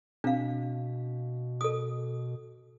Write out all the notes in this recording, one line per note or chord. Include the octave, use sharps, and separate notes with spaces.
B2 C4 D4 F5
A4 D#6